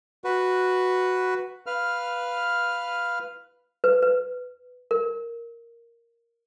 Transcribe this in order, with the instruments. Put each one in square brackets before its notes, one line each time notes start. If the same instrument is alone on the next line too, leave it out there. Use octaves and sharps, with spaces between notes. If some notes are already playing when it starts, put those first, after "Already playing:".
[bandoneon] F#4 B4
[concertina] B4 F5 F6
[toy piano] B4
B4
A#4